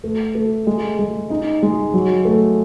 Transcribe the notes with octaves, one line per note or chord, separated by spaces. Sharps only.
A3
A3
G#3
G#3
D#4
G#3
F#3
A3